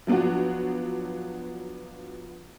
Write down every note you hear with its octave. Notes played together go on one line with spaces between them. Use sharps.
F3 F#3 B3 D4 F#4